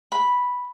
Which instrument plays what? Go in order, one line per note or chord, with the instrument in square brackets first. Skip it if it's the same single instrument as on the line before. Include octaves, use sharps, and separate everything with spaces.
[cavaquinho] B5